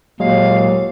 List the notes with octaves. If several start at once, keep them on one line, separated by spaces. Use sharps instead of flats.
D#2 A#2 F#3 G#3 F5